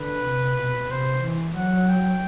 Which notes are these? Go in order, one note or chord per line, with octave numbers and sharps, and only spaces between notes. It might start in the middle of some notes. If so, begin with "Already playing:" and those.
Already playing: D3 B4
C3
B2
C3 C5
E3
F#3 F#5
G5